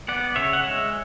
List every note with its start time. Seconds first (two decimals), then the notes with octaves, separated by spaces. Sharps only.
0.08 B3 D5 F#5
0.36 C#3 C#5 E5
0.53 F#5
0.63 G#3 C#5 E5